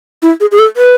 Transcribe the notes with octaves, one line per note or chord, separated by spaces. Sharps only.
E4
G#4
G#4
A4
B4